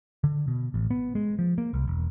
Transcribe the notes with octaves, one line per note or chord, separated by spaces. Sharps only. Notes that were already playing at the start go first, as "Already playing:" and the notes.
D3
B2
A1
B3
G#3
F3
A#3
C2
E1